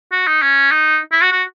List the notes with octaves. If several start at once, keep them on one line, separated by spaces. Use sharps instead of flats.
F#4
D#4
C#4
D#4
E4
F#4
F#4